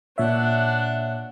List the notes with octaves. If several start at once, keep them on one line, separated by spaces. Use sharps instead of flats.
A#2 D4 C#5 E5 F#5